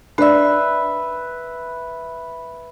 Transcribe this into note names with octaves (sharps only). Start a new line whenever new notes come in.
D4 B4 D5 E5